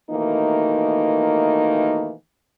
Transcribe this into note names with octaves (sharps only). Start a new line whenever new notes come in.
B2 D#3 E3 A3 A#3 D#4